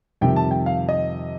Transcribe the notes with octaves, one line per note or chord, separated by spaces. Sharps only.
F2 C3 D#3 G3 G5
A5
G5
F5
D#5